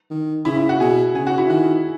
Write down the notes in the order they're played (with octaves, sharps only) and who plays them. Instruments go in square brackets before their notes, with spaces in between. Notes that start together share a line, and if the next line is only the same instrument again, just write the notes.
[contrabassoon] D#3
[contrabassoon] C#3 [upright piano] E4
[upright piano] E4
F#4
[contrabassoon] B2 [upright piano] G#4
[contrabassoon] C#3 [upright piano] G#4
[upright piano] F#4
E4
[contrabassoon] D#3 [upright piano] F#4